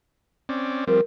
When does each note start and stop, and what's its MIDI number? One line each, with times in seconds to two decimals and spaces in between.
0.49 0.85 60
0.49 0.85 61
0.49 0.85 74
0.87 1.01 53
0.87 1.01 55
0.87 1.01 60
0.87 0.99 70